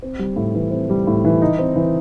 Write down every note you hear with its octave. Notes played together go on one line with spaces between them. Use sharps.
C4
G3
A2
E3
C4
G3
A2
E3
D#4
C4
E3